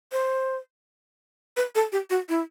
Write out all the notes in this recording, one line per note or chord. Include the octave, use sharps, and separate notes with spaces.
C5
B4
A4
G4
F#4
E4